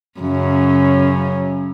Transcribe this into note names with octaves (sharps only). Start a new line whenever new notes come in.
F#2 C#3